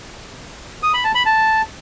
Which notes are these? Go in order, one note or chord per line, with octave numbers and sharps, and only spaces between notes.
D#6
B5
A5
B5
A5